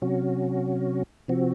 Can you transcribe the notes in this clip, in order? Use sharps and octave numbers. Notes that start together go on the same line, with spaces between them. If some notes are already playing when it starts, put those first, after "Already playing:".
C3 F#3 C#4 F#4
C3 F3 C4 F#4